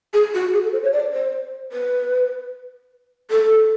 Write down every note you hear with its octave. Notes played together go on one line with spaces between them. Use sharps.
G#4
F#4
G#4
A4
C5
C#5
D5
C5
B4
A4